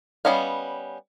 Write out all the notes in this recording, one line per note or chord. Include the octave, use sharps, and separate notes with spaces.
G3 B3 C#4 D#5 F5